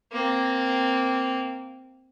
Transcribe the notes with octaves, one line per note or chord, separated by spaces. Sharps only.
A#3 C4